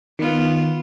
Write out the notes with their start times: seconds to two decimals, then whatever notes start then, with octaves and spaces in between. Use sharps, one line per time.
0.19 D#3 B3 F4